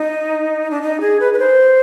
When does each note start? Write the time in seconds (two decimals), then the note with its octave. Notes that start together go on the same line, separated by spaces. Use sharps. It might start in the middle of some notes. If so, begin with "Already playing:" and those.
Already playing: D#4
0.71 D4
0.82 D#4
1.01 G#4
1.20 B4
1.33 B4
1.39 C5